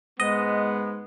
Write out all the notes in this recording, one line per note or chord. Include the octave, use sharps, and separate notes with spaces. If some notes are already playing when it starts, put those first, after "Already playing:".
G#2 G#3 B3 D#5